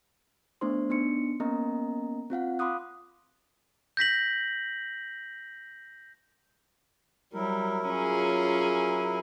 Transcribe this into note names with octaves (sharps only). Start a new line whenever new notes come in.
A3 B3 D4 E4 C5 C6
B3 D4 D#4 C6 C#7
A#3 B3 C#4 A#4 D#5 A#5
C4 F4 F5 F#5
F5 B5 C6 D6 D#6 F#6
G6 A#6 B6 F#7
F#3 G3 E4 A#4
C#4 F4 G#4